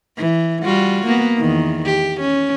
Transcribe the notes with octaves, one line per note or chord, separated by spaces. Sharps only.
E3
G3 F4 F#4
A#3 B3
E2 D#3
G4
C#4